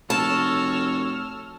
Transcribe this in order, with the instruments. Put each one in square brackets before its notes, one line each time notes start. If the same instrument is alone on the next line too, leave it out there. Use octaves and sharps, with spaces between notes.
[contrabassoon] F1 [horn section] F#4 A4 C#5 [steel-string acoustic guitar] A5 [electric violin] E6 F6